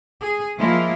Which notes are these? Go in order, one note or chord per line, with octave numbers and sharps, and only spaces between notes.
G#4
F3 G#3 A#3 E4 F4